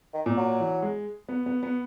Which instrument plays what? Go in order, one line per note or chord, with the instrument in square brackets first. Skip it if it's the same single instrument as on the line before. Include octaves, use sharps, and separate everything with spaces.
[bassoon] D#3
[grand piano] A#2
[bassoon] F#3
[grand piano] E3
G#3
B3
B3
B3